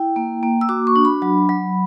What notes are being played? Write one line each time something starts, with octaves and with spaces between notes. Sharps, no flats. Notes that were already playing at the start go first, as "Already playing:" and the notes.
Already playing: E4 G5
A#3
A#3
E6
F#4 D6
C#6
D4
B5
F#3
F#3